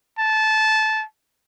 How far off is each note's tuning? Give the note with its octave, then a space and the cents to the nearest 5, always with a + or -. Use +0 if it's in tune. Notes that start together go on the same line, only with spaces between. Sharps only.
A5 -15